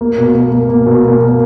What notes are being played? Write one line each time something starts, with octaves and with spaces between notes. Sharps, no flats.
A#3
B2
A#3
A#3
A#3
B2
A#3
A#3